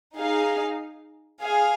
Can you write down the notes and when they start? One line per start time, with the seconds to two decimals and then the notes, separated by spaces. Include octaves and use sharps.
0.17 D#4 G#4 F5
1.42 G#4 F5 G#5